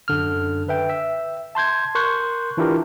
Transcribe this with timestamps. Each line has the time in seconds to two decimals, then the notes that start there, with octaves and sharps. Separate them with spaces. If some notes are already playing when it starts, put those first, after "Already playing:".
0.08 F#2 D3 F6
0.69 B4 E5 G5
0.89 E5
1.55 A5 C6 G6 G#6
1.95 A#4 C6 C#6 F#6 G6
2.57 E3 D4 E4 F4 G4 A#4